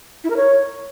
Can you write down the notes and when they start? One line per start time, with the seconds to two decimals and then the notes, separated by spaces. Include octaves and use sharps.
0.24 E4
0.30 A#4
0.36 C#5